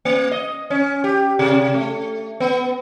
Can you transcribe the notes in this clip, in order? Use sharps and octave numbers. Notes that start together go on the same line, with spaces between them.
A#3
D#5
C#4
G4
C3
A3
B3